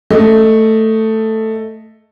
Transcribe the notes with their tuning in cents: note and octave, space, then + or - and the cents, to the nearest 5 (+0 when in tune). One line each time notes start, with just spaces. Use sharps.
A3 +5 D#5 +5